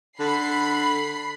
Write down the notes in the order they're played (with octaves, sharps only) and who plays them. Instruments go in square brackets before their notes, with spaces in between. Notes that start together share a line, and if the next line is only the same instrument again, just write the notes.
[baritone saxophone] D3 [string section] B5 C7